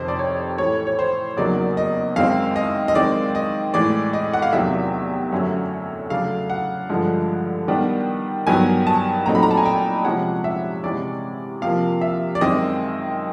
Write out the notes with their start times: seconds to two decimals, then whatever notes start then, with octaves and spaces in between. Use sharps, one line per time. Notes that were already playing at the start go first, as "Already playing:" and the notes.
Already playing: F2 C3 D#3 C5
0.08 D5
0.19 C#5
0.58 A2 E3 A3 C#5
0.87 C#5
0.99 C5
1.37 E2 C#3 F#3 A#3 D#4 D5
1.77 D#5
2.16 F#2 D#3 G#3 C4 D#4 F5
2.56 D#5
2.88 D#5
2.95 D#3 G#3 C4 D5
3.35 D#5
3.74 A2 E3 G#3 D5
4.13 D#5
4.34 F#5
4.42 F5
4.53 E2 C3 D#3 F#3 E5
5.32 F#2 D3 F#3 A3 C#4
6.10 C#3 F#3 A3 D4 F5
6.50 F#5
6.89 G2 D3 F3 G#3
7.68 D#3 G3 B3 D4
8.47 G2 D#3 F#3 B3 G#5
8.87 A5
9.26 A#2 F#3 A3 C4 D#4 A#5
9.35 B5
9.43 A#5
9.51 A5
9.57 G#5
9.65 G5
10.05 C3 F3 G#3 C#4 F#5
10.44 E5
10.84 C3 E3 G#3 C#4 D5
11.62 C3 F3 A#3 F5
12.01 E5
12.35 D5
12.41 F#2 D#3 G#3 C4 D#5